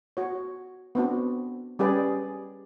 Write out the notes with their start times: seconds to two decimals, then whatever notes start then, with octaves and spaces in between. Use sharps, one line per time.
0.17 F#4 C#5
0.95 B3 C4 D4 F#4
1.79 G3 C#4 G4 G#4 B4 D5